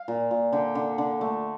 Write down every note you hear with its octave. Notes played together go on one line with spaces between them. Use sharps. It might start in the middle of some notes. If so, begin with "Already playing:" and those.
Already playing: F5
A#2
A#2
D3 G5
D3
D3
A3